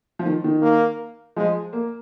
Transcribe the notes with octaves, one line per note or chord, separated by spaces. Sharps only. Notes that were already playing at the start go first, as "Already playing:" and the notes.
F3
D#3
D#3
A#3
F3 G#3
A#3